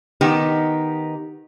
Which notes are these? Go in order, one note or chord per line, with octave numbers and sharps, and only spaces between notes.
D#3 B3 D#4 G4